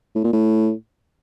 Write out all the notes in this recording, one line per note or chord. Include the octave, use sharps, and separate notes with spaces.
A2
A#2
A2